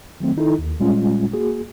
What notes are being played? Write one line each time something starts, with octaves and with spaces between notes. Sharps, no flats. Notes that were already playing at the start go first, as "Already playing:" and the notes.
D#3 F#3 A3 C4
D#3 D#4 E4 A4
D#2
A#2 G3 G#3 C#4 F4
A#3 F#4 G#4